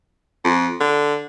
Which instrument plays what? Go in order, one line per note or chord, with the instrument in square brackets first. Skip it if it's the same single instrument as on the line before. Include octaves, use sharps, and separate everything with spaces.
[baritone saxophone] F2
D3